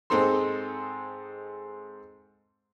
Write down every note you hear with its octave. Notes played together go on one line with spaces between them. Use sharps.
G#2 G#3 C4 D#4 A4 C6